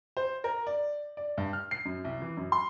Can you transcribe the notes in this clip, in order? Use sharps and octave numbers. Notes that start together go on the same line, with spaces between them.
C5
A#4
D5
D5
G2
F6
C7
F#2
C2
E3
F#2
C6